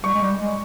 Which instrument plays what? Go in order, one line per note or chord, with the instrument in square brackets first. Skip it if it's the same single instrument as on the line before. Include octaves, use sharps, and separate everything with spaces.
[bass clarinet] G3 [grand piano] C#6
[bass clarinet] G#3
G3
G#3